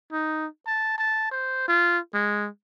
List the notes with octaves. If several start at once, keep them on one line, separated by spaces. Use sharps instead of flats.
D#4
A5
A5
C5
F4
G#3